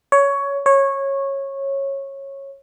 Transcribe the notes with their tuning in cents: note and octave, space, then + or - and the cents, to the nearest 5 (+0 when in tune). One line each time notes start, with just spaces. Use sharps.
C#5 +15
C#5 -15